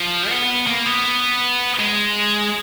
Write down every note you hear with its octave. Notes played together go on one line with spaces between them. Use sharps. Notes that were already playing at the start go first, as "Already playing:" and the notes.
Already playing: F3
B3
A#3
B3
G#3